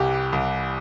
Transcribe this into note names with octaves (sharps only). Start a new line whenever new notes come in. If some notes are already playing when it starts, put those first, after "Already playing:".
Already playing: C2 E3 G3 G4
C2